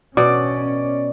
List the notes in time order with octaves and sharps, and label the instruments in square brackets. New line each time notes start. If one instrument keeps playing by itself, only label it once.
[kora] B2 [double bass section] C#4 [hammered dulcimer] D5